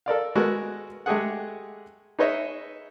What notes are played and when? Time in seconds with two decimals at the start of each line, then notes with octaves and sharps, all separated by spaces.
0.06 A4 A#4 D5 F5
0.35 G#3 B3 F#4 A4 A#4
1.06 G#3 A3 G4 G#4 F#5
2.19 D#4 G#4 B4 C#5 D#5 E5